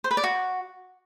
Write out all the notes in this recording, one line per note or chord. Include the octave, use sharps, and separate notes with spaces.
C5
B4
D5
F#4